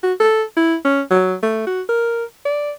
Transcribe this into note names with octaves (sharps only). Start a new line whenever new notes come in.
F#4
A4
E4
C#4
F#3
A3
F#4
A#4
D5